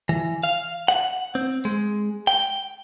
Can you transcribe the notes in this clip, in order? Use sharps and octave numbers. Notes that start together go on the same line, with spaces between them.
E3
F5
F#5
C4
G#3
G5